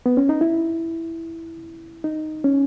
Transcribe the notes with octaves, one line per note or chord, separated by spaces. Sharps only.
B3
C#4
D#4
E4
D#4
C#4